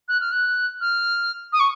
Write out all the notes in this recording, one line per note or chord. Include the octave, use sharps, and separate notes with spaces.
F#6
F6
F#6
F6
D#6
C#6